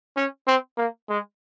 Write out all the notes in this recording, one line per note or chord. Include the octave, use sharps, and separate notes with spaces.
C#4
C4
A#3
G#3